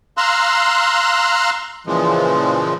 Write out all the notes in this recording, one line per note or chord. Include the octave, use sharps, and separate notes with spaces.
F5 A#5 C6 E6 F#6
A#2 C#3 E3 F3 G#3